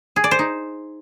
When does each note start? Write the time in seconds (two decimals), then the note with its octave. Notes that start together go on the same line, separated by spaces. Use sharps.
0.16 G#4
0.24 D5
0.31 C5
0.39 D#4